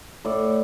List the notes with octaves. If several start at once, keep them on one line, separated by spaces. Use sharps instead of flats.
A2 D5